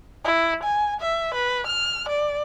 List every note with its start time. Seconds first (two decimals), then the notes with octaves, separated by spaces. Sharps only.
0.24 E4
0.63 G#5
1.01 E5
1.35 B4
1.67 F6
2.09 D5